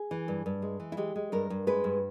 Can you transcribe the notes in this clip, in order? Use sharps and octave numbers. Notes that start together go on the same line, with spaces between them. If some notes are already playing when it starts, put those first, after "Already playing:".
Already playing: G#4
E3
G2
G2
G#3
E3
E4
G#3 G4
G#3
G2 A#4
G2
G#3 B4
G2